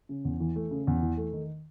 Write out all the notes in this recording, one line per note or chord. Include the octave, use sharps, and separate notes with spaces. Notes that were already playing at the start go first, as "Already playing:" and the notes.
C#3
E2
E3
A3
C#3
E2
E3
A3
D#3